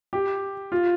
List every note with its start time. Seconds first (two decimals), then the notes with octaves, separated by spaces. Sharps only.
0.13 G4
0.72 F4